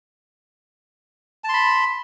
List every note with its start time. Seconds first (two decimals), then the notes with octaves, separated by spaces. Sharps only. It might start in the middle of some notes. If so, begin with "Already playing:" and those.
1.44 A5
1.49 C6
1.53 B5